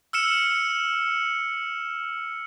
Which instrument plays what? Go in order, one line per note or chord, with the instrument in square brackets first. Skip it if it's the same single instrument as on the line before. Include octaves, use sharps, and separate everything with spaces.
[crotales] E6 F6 C#7 E7